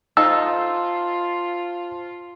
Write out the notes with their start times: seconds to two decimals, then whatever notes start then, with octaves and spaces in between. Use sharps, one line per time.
0.17 D#4 F4 A4 C5 F5 A5 E6